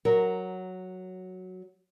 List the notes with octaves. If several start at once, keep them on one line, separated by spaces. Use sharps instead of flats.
F#3 A#4